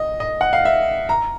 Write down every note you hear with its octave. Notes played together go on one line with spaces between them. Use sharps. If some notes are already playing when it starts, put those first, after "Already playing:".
Already playing: D#5
D#5
F#5
F5
E5
A#5